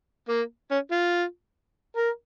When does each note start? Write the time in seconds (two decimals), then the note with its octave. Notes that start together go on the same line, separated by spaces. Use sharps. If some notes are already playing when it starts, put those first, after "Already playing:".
0.29 A#3
0.71 C#4
0.92 F4
1.97 A#4